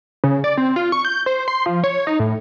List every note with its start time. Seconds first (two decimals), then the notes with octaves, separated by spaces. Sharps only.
0.24 C#3
0.44 D5
0.57 C4
0.76 F4
0.92 C#6
1.05 G6
1.26 C5
1.48 C6
1.66 F3
1.84 C#5
2.07 D#4
2.19 A2